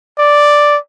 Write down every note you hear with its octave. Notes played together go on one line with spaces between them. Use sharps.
D5